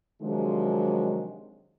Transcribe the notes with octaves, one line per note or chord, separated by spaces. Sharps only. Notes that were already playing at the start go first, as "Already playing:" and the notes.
C3 D#3 F3 F#3 G#3 D4